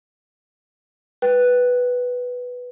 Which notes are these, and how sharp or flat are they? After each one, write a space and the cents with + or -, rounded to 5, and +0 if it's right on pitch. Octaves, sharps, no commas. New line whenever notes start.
B4 +0 G5 -15